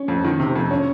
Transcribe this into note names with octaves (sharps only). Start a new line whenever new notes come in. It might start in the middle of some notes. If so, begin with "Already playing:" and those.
Already playing: C#4 C#5
F2
D#3
C3
F2
C#4 C#5